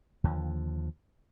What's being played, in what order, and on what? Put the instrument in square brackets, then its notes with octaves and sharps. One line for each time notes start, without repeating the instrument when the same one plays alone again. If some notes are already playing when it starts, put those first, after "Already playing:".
[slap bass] D#2 D3 F3